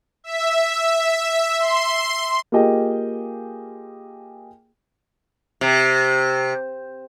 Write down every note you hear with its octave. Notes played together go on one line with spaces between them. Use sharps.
E5
C6
A#3 F4 G4 G#4 D#5 G5
C3